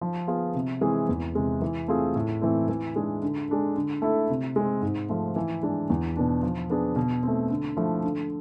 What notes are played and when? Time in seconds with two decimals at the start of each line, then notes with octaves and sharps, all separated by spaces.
0.01 F3
0.27 B3 F4 G#4
0.55 C3
0.81 E3 G#3 C4 G#4
1.09 E2
1.35 C3 G#3
1.62 E3
1.88 A3 C4 F4 G#4
2.16 A2
2.42 E3 A3 C4
2.69 E3
2.96 G#3 D4 G#4
3.22 D3
3.49 G#3 D4 A4
3.76 D3
4.02 A3 E4 A4
4.30 C3
4.56 G#3 C4
4.82 G#2
5.09 F3 A3
5.36 E3
5.63 G#3 D4
5.90 E2
6.17 B2 B3 D4
6.43 F3
6.70 B3 D4 G#4
6.96 B2
7.23 A3 C4
7.50 D3
7.77 F3 A3 E4
8.03 D3